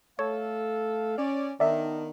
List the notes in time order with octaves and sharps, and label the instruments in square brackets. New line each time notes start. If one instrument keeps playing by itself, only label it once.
[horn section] A3 A4 F5 [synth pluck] C#5
[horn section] C#4 D5
[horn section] D#3 B3 D4 [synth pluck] D5 E5